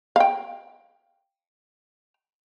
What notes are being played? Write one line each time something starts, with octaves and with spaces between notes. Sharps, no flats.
F5 G5